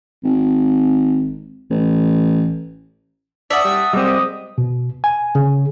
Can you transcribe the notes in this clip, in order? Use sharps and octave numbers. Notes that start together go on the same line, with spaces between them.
G#1
A1
D5 E5 F#5 A5 D#6
G3
G3 G#3 C4 D#5 D6 D#6
B2
G#5
C#3